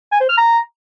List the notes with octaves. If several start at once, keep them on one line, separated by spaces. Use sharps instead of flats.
G#5
C5
F6
A#5